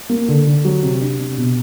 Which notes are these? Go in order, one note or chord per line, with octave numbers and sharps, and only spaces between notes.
A#3
D3
D3
F#3
C3
D4
C3
B2